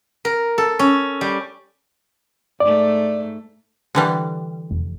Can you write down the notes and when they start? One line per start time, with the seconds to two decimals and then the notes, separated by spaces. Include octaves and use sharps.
0.25 A#4
0.58 A4
0.79 C#4
1.21 G3
2.60 G#2 A3 D5
3.95 D3 E3 G3
4.71 F1